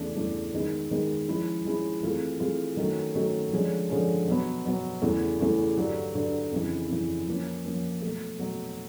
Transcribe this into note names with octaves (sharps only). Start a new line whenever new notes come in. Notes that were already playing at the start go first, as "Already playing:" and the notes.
Already playing: E2 C#3 E3 A3 D4
E2 C#3 E3 A3 D4
F#2 D#3 G#3 B3 D#4
F#2 D#3 G#3 B3 D#4
F3 G#3 C#4 E4
F3 G#3 C#4 E4
E3 A3 C4 F4 G#4
E3 A3 C4 F4 G#4
D#3 F#3 A3 C#4 F#4
D#3 F#3 A3 C#4 F#4
D3 F3 G#3 C#4
D3 F3 G#3 C#4
B2 F#3 B3
B2 F#3 B3
E2 C#3 E3 A3
E2 C#3 E3 A3
G2 D3 F#3
G2 D3 F#3
F2 C#3 E3
F2 C#3 E3
F3 A#3 C#4
F3 A#3 C#4
B2 F#3 A3
B2 F#3 A3